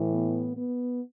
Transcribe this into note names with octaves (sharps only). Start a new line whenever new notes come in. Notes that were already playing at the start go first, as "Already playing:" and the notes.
Already playing: A2 E3
B3
B3